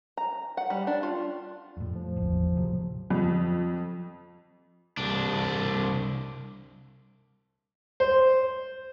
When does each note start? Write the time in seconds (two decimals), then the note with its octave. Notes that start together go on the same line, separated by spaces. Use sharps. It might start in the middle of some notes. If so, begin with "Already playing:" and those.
0.17 A#5
0.57 F#5
0.70 G3
0.87 D4
1.03 F4
1.77 F2 A2
1.95 F3
2.16 D1 G#1 E2
2.55 A2 C3 F#3
3.10 F2
4.97 C2 D4
8.00 C5